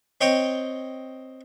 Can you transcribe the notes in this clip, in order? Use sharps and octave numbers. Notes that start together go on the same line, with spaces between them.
C4 C#5 D#5 G5